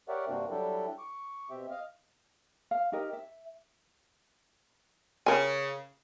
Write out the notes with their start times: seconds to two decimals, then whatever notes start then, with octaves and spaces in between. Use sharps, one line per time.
0.09 G4 A#4 C#5 D5 E5 F#5
0.29 G2 C3 A#3 C4 D4 F#4
0.51 F#3 G3 D4 E4 G4 A4
0.98 C#6 D6
1.50 B2 C4 G4 E5
1.71 D#5 F5 F6
2.71 F5
2.92 D#4 G4 A#4 D#5
3.13 E5
5.26 C#3 A#4 G#5